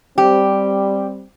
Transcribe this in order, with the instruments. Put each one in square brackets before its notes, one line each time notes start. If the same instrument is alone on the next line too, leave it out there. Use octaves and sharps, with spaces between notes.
[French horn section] G3 C4 [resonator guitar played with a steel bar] G4